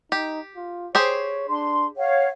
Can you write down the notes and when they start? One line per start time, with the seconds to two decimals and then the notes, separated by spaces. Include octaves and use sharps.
0.12 D#4 G4
0.56 F4
0.95 G4 G#4 C5 C#5
1.49 D4 C6
1.98 C#5 F5 F#5